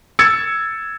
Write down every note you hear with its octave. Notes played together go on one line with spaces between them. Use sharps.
E6 G#6 A6 C#7